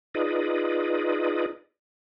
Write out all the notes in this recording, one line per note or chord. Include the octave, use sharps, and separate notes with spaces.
D#4 F4 G#4 B4 D5 D#5